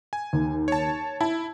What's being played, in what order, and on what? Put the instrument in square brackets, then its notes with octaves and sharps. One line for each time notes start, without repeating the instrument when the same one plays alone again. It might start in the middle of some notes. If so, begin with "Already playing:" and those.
[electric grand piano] G#5
[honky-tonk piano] D#2
[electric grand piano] C#5 A5
[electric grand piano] E4 [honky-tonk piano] A5